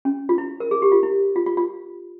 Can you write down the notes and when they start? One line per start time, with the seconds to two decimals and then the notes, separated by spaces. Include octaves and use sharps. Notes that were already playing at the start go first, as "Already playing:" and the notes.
0.05 C#4
0.29 F4
0.38 E4
0.60 A#4
0.71 G#4
0.82 G4
0.92 F4
1.03 E4
1.36 F4
1.46 F4
1.57 F4